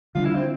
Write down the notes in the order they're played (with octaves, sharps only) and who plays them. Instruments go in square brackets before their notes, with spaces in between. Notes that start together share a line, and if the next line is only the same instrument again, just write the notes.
[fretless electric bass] D3 G3 D4 [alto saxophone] F4
[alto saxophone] E4
C4